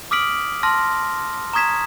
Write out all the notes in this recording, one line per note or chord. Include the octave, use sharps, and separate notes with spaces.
D6 D#6 F6 B6 D7 F#7
A5 C6 F6 A#6
A#5 C#6 D#6 G#6 B6 E7